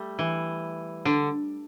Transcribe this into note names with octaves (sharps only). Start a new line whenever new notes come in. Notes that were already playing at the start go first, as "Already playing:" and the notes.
Already playing: G3 A3
E3
D3